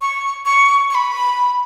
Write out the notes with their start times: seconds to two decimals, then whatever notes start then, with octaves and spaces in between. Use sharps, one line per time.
0.01 C#6
0.45 C#6
0.90 C#6
0.95 B5